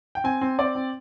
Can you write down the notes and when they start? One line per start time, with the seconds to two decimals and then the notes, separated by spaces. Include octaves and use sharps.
0.15 G5
0.24 C4 G#5
0.41 C4
0.58 C4 D5
0.75 C4